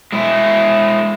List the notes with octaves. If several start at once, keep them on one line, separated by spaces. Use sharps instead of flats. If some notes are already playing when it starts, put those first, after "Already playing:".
G#3 E4